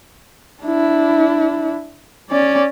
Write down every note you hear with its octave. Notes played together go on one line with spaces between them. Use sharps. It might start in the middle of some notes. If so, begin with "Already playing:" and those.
D4 E4
C#4 D5